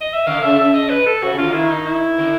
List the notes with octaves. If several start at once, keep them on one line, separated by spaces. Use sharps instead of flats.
D#5
E5
D3 F5
C#3 E5
E5
D#5
B4
A4
C3 F#4
C#3
D3 F4
D#3 E4
D#4
E4
D3